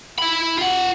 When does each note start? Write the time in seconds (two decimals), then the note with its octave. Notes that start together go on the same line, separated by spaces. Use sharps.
0.19 E4 B5
0.58 F4 F#5